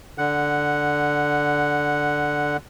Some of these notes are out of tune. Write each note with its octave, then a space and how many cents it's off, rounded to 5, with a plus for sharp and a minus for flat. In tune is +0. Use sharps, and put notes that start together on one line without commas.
D3 +0 F#5 +0